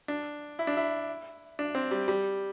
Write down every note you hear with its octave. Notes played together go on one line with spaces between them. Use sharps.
D4
E4
D4
E4
D4
C4
G3
G3